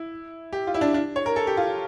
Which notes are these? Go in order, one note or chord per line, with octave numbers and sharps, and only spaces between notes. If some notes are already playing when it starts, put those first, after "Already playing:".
Already playing: E4
G4
F4
E4
D4
D4
C#5
A#4
A4
G4
F4